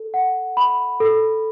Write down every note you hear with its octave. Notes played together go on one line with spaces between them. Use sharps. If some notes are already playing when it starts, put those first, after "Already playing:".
Already playing: A4
F#5
B5
A4